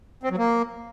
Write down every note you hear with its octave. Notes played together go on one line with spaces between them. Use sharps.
C4
F#3
A#3